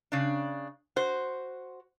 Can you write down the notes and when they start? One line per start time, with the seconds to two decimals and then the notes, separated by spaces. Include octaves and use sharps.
0.12 C#3 D4
0.96 F#4 C5